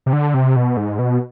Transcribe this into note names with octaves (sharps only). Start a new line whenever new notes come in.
C3
D3
C3
B2
G#2
B2